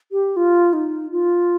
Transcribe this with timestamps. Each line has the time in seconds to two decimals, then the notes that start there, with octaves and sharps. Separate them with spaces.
0.12 G4
0.36 F4
0.73 D#4
1.12 F4